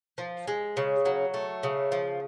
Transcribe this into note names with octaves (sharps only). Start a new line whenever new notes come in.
F3
G#3
C#3
F#3
A3
C#3
F3